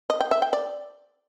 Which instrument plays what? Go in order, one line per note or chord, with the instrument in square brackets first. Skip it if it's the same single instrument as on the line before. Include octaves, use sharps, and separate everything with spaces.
[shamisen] D#5
G5
E5
G5
D5